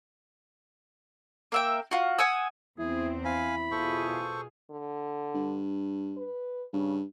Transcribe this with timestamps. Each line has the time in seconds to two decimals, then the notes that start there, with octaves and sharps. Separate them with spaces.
1.52 A#3 E5 G5
1.91 F4 F#4
2.19 F#5 G#5 D#6 E6
2.79 E2 C4 E4 G#4
3.25 E4 F5 G#5 B5
3.71 B2 F4 G#4 A4 C5 C#6
4.70 D3
5.35 G2
6.17 B4
6.73 G2 C#3